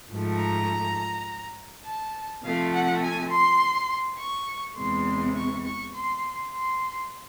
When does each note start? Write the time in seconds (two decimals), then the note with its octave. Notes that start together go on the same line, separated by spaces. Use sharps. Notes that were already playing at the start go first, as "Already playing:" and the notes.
0.11 G#2 F3 A3
0.40 A#5
1.86 A5
2.44 C3 F3 A3 F5
2.73 F#5
3.03 G#5
3.32 C6
4.20 C#6
4.78 E2 C3 E3 G#3 C6
5.36 C#6
5.66 C#6
5.94 C6
6.54 C6